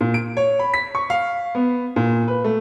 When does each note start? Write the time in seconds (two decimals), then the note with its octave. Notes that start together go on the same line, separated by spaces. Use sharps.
0.01 A#2
0.14 D7
0.37 C#5
0.59 B5
0.74 B6
0.95 C#6
1.10 F5
1.55 B3
1.96 A#2
2.28 B4
2.44 A3